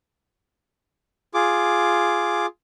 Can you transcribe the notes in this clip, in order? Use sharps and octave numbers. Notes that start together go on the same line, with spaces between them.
F4 G#4 D6